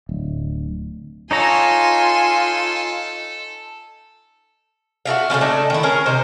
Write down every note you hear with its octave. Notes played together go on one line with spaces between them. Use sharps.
D1
D#4 F4 A4 C#5 G#5 A#5 C6
F#4 A4 E5 F5
C#3 A3 B3 C#4
C#3 A3 D4 D#4
D#3 E4
C#4 G#4 A#4
C3 D#4 C5